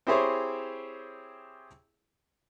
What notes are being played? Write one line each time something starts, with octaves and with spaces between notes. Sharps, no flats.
C4 E4 G4 G#4 C5 C#5